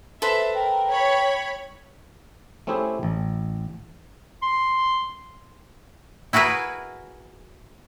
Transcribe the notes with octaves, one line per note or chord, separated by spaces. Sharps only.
A4 B4 C5 E5
A#4 G5
C#5 B5
A3 C4 C#4 E4 G4 G#4
A1
C6
E4 F#4 G#4 A#4 B4